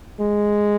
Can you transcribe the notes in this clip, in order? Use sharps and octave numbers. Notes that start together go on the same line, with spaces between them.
G#3